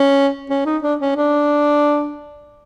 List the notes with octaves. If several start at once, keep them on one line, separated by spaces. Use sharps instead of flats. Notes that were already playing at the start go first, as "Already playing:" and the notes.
Already playing: C#4
C#4
D#4
D4
C#4
D4